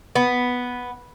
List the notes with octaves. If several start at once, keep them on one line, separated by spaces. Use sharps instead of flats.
B3